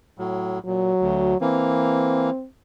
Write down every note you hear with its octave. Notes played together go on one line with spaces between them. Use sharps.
A2 F#3
A#2 F#3
D2
E3 A#3 C4